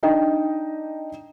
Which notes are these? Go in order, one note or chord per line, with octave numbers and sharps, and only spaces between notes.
D4 D#4 D#5 G5